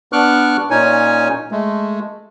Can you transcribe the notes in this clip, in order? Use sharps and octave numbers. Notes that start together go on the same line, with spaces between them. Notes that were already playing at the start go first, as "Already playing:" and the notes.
B3 D4 C#6 D6 F6 F#6
A#2 C#4 D#4 C#5 G#5
G#3 A3